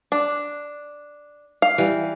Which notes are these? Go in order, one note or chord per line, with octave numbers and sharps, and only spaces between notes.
D4
F5
E3 G3